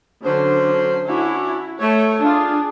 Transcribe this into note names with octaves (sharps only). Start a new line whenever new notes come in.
D3 F#3 C#4 C5
C#4 D4 E4 F#4
A3 C#5
D4 F4 G#4